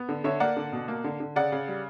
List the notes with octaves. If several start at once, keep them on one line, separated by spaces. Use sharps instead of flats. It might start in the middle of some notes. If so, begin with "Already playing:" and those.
Already playing: B3
D3
D3 C#5 E5
A#3 D5 F#5
D3
B2
A#3
D3
D3
C#3 D5 F#5
C#3
G3